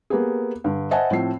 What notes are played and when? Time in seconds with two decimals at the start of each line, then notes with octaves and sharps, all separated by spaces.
0.10 A#3 B3 G4 G#4
0.64 G2 D3
0.91 C5 D#5 E5 F#5 G#5 A5
1.11 A2 F3 C4 C7